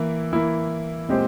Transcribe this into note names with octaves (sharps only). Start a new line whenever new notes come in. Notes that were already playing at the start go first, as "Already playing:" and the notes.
Already playing: E3 A#3 E4
E3 A#3 E4
A#2 G#3 C4 G4 C5